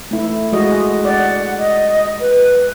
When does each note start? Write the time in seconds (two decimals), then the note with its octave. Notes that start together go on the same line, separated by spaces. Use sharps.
0.11 A3 E4
0.52 G#3 F#4 D#5
1.05 D5 F#5
1.58 D#5
2.21 B4